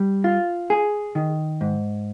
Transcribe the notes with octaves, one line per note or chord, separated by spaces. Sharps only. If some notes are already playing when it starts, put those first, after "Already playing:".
Already playing: G3
F4
G#4
D#3
G#2